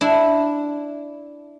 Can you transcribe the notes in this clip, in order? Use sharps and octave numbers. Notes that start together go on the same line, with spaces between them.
D4 E4